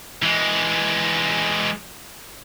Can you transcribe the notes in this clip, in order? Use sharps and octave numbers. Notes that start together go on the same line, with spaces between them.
E3 G#3